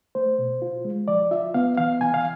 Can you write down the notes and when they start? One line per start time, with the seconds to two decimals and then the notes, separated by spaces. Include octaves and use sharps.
0.15 A3 C5
0.39 B2
0.62 F4
0.85 G#3
1.08 F3 D5
1.31 F4 E5
1.54 B3 F5
1.78 E3 F5
2.00 E3 G#5
2.14 F5